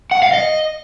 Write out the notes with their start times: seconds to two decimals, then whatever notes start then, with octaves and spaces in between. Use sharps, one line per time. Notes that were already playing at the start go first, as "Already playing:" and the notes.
0.11 F#5
0.22 F5
0.33 D#5